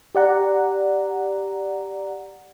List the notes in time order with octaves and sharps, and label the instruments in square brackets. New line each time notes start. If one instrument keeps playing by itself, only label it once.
[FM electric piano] G4 D5 F#5 A#5